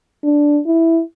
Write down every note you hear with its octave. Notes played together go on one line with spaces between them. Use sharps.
D4
E4